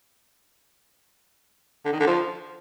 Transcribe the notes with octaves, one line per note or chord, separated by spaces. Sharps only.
D3
D#3
D3
F3